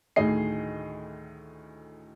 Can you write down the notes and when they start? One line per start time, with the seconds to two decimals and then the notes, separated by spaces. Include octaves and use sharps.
0.16 D2 A2 D#3 G#4 D#5 C7